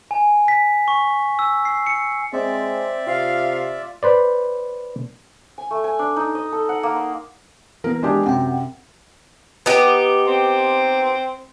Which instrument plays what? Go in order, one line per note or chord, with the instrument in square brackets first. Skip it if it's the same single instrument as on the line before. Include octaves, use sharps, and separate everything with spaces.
[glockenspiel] G#5
B6
C#6
E6
C7
C#7
[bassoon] G#3 [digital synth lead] C4 [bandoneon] D5 E5
[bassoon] C3 [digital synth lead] F4 [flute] F5
[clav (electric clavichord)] B4 C5 D5
[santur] G#5
A3
G#5
D4
D#4
D#5
A4
F#5
A#3
C6
[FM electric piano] E3 B3 [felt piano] A#4
[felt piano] G#3 D4 G4
[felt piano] F#2 C3 [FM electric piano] F#5 G5
[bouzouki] B3 D#4 G4
[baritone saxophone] C4